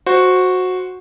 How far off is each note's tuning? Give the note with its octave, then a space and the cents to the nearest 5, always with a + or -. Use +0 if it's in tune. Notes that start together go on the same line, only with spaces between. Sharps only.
F#4 -10 C5 +0